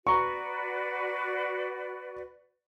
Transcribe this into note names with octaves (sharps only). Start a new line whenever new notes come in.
F#4 B4 D5 A#5 C#6